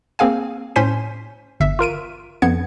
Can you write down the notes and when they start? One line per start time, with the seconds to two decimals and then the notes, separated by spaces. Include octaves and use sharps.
0.19 A#3 C4 G#4 F5 G#5
0.76 A2 C#4 C5 C6 B6 D#7
1.60 G1 E5
1.79 F4 A#4 D7 D#7
2.42 F2 B3 G#6 C#7